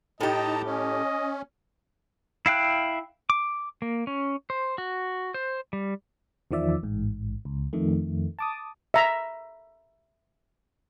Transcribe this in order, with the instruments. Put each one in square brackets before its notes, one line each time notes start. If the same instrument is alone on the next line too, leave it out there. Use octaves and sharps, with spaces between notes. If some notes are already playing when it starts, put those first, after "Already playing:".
[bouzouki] A2 G4 [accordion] D#4 A5 A#5 [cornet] D#5
[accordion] C#4 [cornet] D#5
[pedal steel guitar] E4 F5 G5 F#6
D6
A#3
C#4
C5
F#4
C5
G3
[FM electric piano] E2 D#3 F3 D5 E5
A1 G#2
C#2
F2 D#3 A3
A5 D6 D#6
[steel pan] E5 A#5